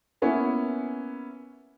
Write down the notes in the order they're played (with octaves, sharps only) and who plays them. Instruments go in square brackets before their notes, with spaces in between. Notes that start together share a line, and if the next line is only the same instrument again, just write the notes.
[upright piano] A#3 B3 C#4 E4